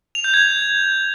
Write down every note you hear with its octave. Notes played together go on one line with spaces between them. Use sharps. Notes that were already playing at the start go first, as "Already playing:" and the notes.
F7
G6
G#6